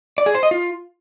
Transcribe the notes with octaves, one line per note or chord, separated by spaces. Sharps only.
D5
G#4
C5
D#5
F4